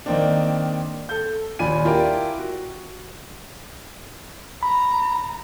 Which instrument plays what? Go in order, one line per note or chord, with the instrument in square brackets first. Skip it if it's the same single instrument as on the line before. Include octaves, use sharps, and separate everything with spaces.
[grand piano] D#3 A#3 C4 D4
A4 G6
D#2 A#2 D4 G#5 B5 D#7
E4 F4 G4 A#4 D5
F#4
[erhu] A#5 [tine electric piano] B5